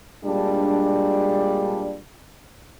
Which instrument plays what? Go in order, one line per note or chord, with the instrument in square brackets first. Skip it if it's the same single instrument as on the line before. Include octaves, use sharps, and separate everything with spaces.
[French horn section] A#2 G3 G#3 D4